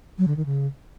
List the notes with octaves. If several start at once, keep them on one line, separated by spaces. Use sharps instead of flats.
F#3
D3
D#3
C#3